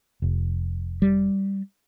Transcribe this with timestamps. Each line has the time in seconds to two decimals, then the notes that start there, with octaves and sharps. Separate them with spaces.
0.22 F1
1.02 G3